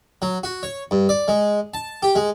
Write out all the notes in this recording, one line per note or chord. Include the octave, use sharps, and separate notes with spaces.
F#3
F#4
C#5
G2
D5
G#3
A5
G4
G#3